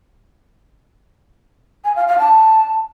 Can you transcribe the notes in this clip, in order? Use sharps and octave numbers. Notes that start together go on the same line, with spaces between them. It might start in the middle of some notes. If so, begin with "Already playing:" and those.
G#5
F5
F5
A5